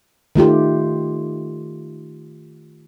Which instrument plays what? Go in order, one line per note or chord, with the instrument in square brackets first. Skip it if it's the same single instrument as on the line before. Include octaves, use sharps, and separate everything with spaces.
[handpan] D#3 A3 F4 G4